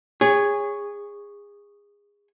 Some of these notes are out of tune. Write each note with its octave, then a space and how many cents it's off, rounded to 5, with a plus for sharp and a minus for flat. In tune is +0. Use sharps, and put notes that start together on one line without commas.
G#4 -25 C#5 +0